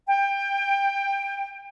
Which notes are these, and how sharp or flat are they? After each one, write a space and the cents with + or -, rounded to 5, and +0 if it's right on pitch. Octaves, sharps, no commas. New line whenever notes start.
G5 +20